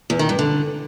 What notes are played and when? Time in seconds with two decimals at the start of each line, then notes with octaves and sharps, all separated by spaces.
0.10 E2
0.19 D#3
0.29 G2
0.39 D3